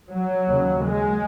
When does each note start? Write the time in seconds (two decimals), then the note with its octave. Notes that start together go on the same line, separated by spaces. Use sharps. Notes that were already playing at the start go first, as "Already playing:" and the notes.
0.09 F#3
0.46 D#2 C#3
0.83 G#3